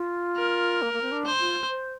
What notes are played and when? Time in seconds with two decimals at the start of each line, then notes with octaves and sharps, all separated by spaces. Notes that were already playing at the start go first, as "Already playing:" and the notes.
Already playing: F4
0.37 A#4
0.82 A#3
0.93 A#3
1.02 C4
1.12 D4
1.26 C5
1.40 F4
1.70 C5